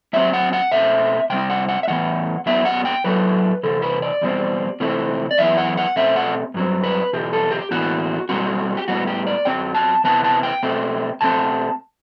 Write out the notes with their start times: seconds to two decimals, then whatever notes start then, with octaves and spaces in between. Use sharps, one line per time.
0.13 A2 F#3 C4 E5
0.33 F#5
0.53 F#5
0.72 B2 A3 C4 E5
1.30 C3 G3 C4 G5
1.50 F#5
1.69 F#5
1.83 E5
1.88 A2 E3 B3 F#5
2.46 F#2 F#3 B3 E5
2.65 F#5
2.85 G5
3.04 A2 F#3 A3 B4
3.63 E2 C3 A4
3.82 B4
4.02 D5
4.21 E2 B2 G3 C4
4.80 C3 E3 A3 C4
5.31 D5
5.38 F#2 E3 B3 E5
5.57 F#5
5.77 F#5
5.96 B2 A3 C4 E5
6.16 F#5
6.54 G2 F#3 C4
6.84 B4
7.13 E2 B2 G4
7.33 A4
7.51 G4
7.71 A2 E3 B3 F#4
8.29 B2 G3 C4 F#4
8.77 G4
8.88 A2 G3 B3 F#4
9.07 G4
9.27 D5
9.45 F#2 F#3 C4 G5
9.75 A5
10.04 E2 C3 E3 B3 A5
10.24 A5
10.43 G5
10.63 B2 A3 C4
11.21 B2 A3 C4 A5